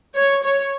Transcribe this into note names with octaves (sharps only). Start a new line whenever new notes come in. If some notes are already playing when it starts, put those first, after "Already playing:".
C#5
C#5